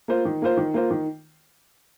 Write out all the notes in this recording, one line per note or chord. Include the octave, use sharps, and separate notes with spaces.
A#3 F4 C5
D#3
A#3 F4 C5
D#3
A#3 F4 C5
D#3